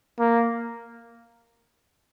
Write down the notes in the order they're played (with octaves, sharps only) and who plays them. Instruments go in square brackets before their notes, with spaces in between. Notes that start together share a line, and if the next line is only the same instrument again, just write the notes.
[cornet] A#3